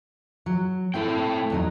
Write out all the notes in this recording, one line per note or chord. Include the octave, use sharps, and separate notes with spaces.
F#3
A2 A3 C4 E4 A4 G5
E2 F#3 D#4